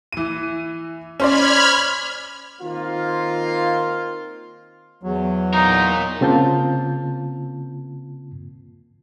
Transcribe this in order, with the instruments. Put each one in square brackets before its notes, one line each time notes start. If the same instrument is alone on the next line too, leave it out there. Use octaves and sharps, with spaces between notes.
[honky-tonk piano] E3 D#7
[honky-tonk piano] C#4 C5 D5 [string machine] B5 F6 G#6
[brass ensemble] D#3 A#3 C4 F4
[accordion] E2 F#3
[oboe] D#4 [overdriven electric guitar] F4 A#4
[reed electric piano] C#3 A#3 C4 F4 A5 G6